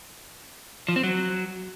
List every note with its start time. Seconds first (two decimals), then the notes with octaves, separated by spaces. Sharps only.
0.88 F3
0.96 C4
1.04 F#3